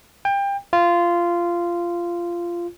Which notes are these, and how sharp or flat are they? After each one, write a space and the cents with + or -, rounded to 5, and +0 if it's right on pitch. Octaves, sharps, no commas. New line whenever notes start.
G5 +25
F4 -15